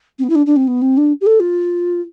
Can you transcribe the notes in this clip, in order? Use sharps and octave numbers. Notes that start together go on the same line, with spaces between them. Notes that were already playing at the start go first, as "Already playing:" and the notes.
C4
B3
E4
D4
D4
C4
B3
C4
D4
G4
A4
F4